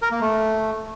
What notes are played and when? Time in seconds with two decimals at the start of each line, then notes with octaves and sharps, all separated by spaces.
0.02 A#4
0.11 A#3
0.21 A3